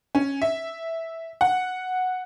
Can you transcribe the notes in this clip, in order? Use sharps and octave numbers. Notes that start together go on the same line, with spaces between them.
C#4
E5
F#5